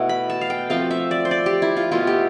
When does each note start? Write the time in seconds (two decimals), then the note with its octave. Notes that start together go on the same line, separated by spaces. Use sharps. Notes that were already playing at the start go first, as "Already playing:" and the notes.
Already playing: B2 A3 E4
0.09 B5
0.30 A5
0.41 F5
0.50 G5
0.70 F3 A3 C4 F5
0.91 E5
1.11 D5
1.25 C5
1.31 D5
1.46 G4
1.62 E4
1.77 F4
1.91 B2 A3 E4 F4
2.07 G4